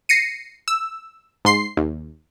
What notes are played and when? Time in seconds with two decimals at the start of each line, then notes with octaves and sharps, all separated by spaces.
0.09 A#6 C7 C#7 D#7
0.68 E6
1.45 G#2 C6 C7
1.77 D#2